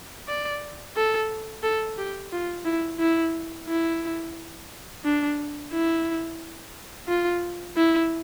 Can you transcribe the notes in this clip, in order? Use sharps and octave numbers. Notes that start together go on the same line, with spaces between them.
D5
A4
A4
G4
F4
E4
E4
E4
D4
E4
F4
E4